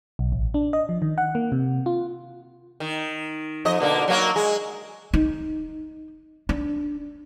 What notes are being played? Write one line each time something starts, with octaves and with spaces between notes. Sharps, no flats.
B1
A1
D4
D#5
F3
D#3
F#5
A#3
C3
F4
D#3
F2 D#5
B2 D3 A#3
F#3 A#3 A#4
G#3
D#4
D4